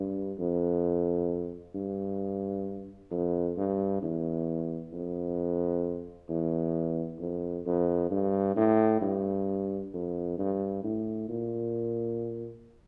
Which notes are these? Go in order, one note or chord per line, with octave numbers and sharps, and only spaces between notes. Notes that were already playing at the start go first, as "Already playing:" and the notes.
Already playing: G2
F2
G2
F2
G2
E2
F2
E2
F2
F2
G2
A2
G2
F2
G2
A2
A#2